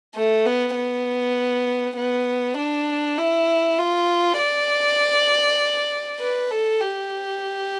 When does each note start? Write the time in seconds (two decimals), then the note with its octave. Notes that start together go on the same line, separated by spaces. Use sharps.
0.15 A3
0.46 B3
0.76 B3
1.97 B3
2.58 D4
3.18 E4
3.78 F4
4.39 D5
6.20 B4
6.51 A4
6.81 G4